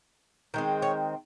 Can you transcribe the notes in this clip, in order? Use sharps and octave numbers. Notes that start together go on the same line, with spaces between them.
D#3 G#3 C4
C#5